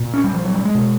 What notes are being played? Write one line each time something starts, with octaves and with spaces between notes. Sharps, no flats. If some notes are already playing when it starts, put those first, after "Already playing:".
Already playing: A#2
C#4
G3
F3
F#3
G3
G#3
B2